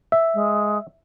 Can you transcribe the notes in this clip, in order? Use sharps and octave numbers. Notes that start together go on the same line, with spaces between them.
E5
G#3